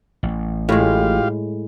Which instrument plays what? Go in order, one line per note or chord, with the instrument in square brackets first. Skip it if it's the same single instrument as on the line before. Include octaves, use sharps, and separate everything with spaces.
[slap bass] A1
[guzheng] A2 G#3 [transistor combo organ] F4 G4 F5